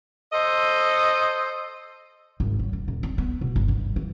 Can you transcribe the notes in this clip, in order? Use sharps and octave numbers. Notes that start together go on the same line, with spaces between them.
A4 C5 D#5
G#1
F#3
D#1
D#1
C4
B3
B2
G1
G2
E3